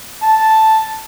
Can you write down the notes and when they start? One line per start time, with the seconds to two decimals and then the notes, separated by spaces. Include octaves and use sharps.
0.23 A5